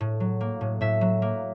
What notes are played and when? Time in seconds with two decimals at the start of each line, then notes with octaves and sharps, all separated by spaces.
0.01 A2
0.20 F#3
0.41 A#3
0.61 A2
0.81 A2 E5
1.01 F#3
1.22 A#3